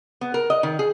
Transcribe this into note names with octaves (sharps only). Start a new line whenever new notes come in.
B3
A#4
D#5
D#3
G#4